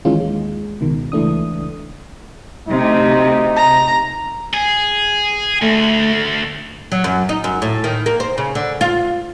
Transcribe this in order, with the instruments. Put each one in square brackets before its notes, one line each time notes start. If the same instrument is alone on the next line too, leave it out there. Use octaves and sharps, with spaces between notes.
[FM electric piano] D#3 E3 G#3 C#4 D#4 F4
D#2 G#3
C#2 B2 D#3
C#2 E3 A3 D4 D#6
[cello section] D2 C3 [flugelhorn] D#4
[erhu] A#5
[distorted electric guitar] G#4
[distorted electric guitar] D2 [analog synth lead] A3
[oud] F#3
F#2
D#4
F#2
A2
D#3
A#3
C5
C#3
D3
F4